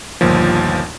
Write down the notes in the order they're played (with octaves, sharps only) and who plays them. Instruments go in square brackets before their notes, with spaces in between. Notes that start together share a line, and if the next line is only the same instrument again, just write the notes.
[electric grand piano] G1 D#2 A#2 F3